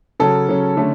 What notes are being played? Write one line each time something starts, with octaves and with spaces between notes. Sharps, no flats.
C#3 F#3 C#4 A4
C#3 F#3 C#4
D3 A3 C#4